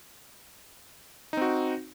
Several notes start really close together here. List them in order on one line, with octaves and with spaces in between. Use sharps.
D#4 C4 F#4